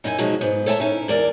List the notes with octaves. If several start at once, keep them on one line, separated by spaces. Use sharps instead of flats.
F#2 D#4 E4 F#4 G#5
B2 F3 F#3 G#3 D#4 F#4
G#2 B3
A4 C#5 E5 G5 A5 A#5
C#4 D#4 E4
E2 A#4 D5